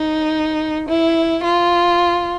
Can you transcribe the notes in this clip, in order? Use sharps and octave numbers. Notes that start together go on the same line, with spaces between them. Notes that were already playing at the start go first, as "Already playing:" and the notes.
Already playing: D#4
E4
F4